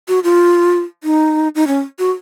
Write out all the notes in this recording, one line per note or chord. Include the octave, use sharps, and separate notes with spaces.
F#4
F4
D#4
D#4
C#4
F#4